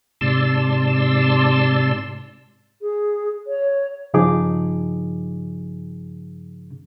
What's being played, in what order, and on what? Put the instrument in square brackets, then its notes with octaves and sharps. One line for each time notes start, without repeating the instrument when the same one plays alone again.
[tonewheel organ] G#2 C3 D5 A5 C6 E6
[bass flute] G#4
C#5
[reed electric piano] G2 C#3 F3 D#4 G#4 D6